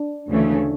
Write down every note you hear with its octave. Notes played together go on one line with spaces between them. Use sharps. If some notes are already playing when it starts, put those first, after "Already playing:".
Already playing: D4
D2 C#3 E3 A3 C#4